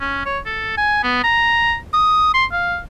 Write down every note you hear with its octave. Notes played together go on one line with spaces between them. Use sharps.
C#4
C#5
A4
G#5
B3
A#5
D#6
C6
F5